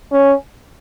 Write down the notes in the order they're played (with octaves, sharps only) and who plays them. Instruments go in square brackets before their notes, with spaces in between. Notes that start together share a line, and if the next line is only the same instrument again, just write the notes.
[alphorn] C#4